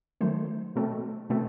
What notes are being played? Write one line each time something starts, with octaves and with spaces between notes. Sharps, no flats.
D#3 F#3 A3 C5
B2 A3 C4
B2 A3 C4